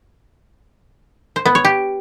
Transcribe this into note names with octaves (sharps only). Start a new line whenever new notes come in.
C5
B3
C#5
G4